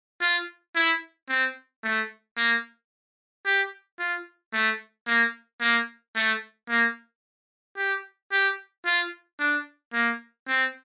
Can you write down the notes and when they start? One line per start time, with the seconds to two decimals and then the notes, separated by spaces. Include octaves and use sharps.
0.21 F4
0.76 E4
1.29 C4
1.84 A3
2.38 A#3
3.46 G4
3.99 F4
4.53 A3
5.07 A#3
5.61 A#3
6.16 A3
6.69 A#3
7.77 G4
8.32 G4
8.86 F4
9.40 D4
9.93 A#3
10.48 C4